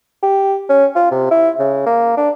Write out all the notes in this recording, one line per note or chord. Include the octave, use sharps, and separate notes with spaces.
G4
C#4
F4
C3
E4
C#3
A#3
D4